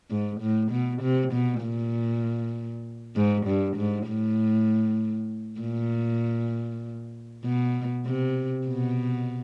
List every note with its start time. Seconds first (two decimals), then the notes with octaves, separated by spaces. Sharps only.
0.11 G#2
0.41 A2
0.71 B2
1.02 C3
1.33 B2
1.62 A#2
3.16 G#2
3.47 G2
3.77 G#2
4.08 A2
5.60 A#2
7.44 B2
8.06 C3
8.67 B2